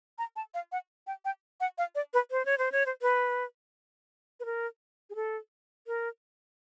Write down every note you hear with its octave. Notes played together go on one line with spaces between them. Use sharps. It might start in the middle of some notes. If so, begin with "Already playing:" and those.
A#5
A5
F5
F#5
G5
G5
F#5
F5
D5
B4
C5
C#5
C5
C#5
C5
B4
B4
A#4
G#4
A4
A#4